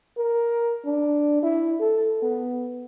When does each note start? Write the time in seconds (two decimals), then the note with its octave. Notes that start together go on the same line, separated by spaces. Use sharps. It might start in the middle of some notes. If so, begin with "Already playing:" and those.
0.17 A#4
0.85 D4
1.42 E4
1.80 A4
2.22 B3